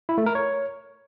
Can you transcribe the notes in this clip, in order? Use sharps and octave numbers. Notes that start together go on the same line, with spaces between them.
E4
A3
A#4
C#5